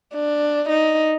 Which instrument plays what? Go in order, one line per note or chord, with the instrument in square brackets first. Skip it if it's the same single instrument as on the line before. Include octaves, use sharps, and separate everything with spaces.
[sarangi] D4
D#4